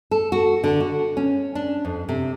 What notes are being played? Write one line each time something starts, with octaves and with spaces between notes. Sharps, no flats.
A4
F#4
D3
F#4
C#4
D4
F2
C3